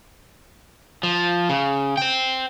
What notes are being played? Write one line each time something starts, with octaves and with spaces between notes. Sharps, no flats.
F3
C#3
C5 G5